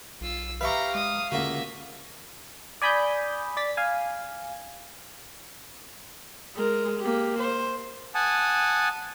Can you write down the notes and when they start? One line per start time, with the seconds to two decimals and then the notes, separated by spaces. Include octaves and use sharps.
0.21 B1 F4 E6
0.61 G4 B4 E5 F5 A#5 C#6
0.95 G#3 D#6
1.32 C#2 D3 A#3 F#4 E5
2.82 D5 G#5 B5 D#6 G6
3.57 D5 A6 B6
3.77 F5 G#5
6.55 G#3 A#4
6.99 A#3 G4
7.39 C5
8.15 F#5 G#5 A5 D#6